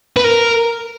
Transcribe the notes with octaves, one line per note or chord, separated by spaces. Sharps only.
B4
A#4